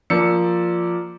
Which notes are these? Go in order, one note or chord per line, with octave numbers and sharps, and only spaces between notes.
F3 A#3 D5 E6 C#7